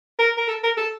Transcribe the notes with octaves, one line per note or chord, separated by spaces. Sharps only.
A#4
A#4
A4
A#4
A4